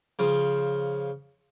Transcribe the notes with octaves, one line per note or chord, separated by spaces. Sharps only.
C#3 F3